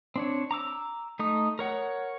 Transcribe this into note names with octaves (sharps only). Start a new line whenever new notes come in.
C4 D4 C#5
A#5 D6 E6
A3 D#4 D#6
A#4 C#5 F#5